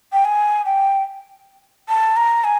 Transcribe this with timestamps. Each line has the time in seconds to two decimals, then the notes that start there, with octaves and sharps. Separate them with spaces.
0.13 G5
0.25 G#5
0.65 G5
1.89 A5
2.17 A#5
2.44 G#5